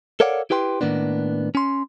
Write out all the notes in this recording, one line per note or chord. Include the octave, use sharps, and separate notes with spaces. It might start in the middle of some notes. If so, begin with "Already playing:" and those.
A4 A#4 C#5 D5 F5 F#5
E4 G4 B4 G5 C6
A2 D#3 A#3 B3 D4
C#4 C6